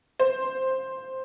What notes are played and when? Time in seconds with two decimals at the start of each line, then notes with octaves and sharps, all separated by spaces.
0.19 C5